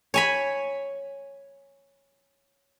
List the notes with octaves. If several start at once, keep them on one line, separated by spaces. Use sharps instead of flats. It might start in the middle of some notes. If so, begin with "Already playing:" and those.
C#5 G#5 B5